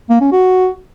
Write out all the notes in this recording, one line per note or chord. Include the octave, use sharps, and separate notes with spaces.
A#3
C#4
F#4